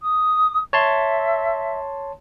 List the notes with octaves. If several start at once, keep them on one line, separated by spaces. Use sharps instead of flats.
D#6
C#5 E5 A5 C6